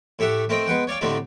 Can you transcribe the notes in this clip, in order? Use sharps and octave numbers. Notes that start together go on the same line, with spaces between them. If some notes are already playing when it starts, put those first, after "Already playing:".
A2 A3 G4 E5 F#5
A3 C4 A#4 C5 D#5 G5
G#3 B3 F#5 G5
C#5 D5 F5 G5
A2 D3 G3 A3 C4 D#4